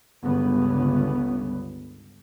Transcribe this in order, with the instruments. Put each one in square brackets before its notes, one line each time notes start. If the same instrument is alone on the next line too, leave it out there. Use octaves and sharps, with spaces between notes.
[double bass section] G1 C#2 G2 C#3 B3